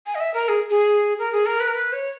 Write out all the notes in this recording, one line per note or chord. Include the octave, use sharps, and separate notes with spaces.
G#5
D#5
E5
A#4
G#4
G#4
A#4
G#4
A#4
B4
A#4
B4
C#5